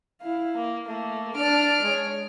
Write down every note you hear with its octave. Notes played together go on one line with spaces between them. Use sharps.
E4 F5
A#3
A3 A#3
D4 D5 F6 D7
G#3 C#5